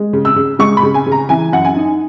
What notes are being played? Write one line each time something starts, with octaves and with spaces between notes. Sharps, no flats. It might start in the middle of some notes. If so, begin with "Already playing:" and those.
Already playing: G#3
C#3
E6
C#3
G#3 C#6
B5
C#3
G#5
C#3
A#5
E3 G#5
F#2 F#5
G#5
D#4